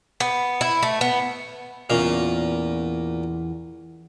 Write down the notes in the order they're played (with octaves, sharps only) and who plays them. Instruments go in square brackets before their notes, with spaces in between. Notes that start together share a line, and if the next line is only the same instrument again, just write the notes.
[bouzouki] B3
E4
A3
B3
[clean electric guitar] E2 C#4 F5 [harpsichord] A#2